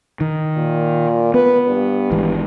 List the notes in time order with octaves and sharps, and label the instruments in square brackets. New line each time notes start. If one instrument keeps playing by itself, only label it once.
[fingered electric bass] D#3
[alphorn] A#2
[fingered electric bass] B3 [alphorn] B4
[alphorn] G2
[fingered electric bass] G#1 G#2 E3